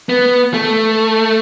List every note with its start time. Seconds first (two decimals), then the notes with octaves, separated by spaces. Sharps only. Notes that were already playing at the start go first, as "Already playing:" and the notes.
0.09 B3
0.54 A3